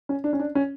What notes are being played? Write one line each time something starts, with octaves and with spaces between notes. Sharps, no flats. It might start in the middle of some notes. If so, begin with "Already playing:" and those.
C#4
D4
C#4
D4
C#4